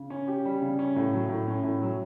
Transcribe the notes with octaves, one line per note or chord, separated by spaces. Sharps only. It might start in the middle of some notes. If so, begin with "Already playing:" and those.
Already playing: C#3
C#4
G4
G3
C#3
C#4
A2
F#3
A2
C#4
A2
F#3